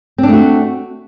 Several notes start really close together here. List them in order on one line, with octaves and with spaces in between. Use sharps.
C4 D4 A3 F#4